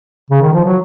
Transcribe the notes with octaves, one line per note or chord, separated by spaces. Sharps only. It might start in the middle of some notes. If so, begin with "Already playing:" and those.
C#3
D#3
F3
F#3